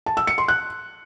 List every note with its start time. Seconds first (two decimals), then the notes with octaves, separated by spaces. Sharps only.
0.06 A5
0.17 E6
0.27 C#7
0.38 C6
0.48 F#6